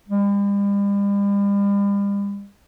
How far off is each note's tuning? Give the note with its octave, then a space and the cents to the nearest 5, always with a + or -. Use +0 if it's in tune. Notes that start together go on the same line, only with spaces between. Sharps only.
G3 +40